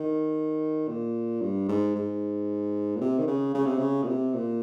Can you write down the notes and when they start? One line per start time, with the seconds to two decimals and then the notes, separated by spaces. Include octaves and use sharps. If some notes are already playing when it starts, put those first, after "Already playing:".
Already playing: D#3
0.88 A#2
1.42 G2
1.68 G#2
1.95 G#2
2.96 A#2
3.01 C3
3.19 D#3
3.27 C#3
3.54 C#3
3.66 C3
3.79 C#3
4.03 A#2
4.07 C3
4.34 A#2